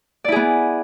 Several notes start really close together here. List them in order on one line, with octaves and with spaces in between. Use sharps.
D5 E4 G#4 B3